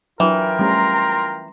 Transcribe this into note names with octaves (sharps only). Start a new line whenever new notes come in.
E3 F#3 D4 F4 A#4 G5
G3 A3 C#4 A#5 C6